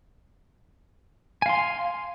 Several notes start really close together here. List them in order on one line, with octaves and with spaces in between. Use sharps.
G#5 F5 C6